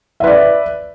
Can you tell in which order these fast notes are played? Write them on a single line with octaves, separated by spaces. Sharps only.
E5 B4 D5